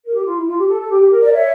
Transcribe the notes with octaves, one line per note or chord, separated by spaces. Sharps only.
A#4
G4
F4
E4
F4
G4
A4
A4
G4
G4
A#4
A#4 D5
C#5 E5